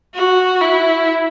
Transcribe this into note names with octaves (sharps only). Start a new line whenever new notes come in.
F#4
E4